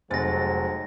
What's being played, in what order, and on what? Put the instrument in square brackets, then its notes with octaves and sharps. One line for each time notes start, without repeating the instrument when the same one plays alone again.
[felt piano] F1 A6 [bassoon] G#2 [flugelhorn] F#3 [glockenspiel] G#5 A#6